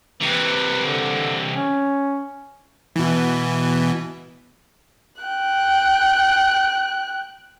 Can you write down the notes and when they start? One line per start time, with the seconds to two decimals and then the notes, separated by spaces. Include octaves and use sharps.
0.21 C3 E3 B4
0.83 D3
1.54 C#4
2.96 B2 E3
5.21 G5 F#6